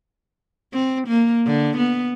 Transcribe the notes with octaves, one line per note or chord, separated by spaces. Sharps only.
C4
A#3
D3
B3